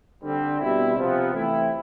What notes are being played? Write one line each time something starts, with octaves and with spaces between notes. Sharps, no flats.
D3 G3 C4
B2 G3 C4 E4
C3 F3 B3
E3 A3 C4 E4